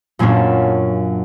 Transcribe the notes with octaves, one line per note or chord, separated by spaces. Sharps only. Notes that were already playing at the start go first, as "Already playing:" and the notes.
F#2 A#2 A#3 C#4 D4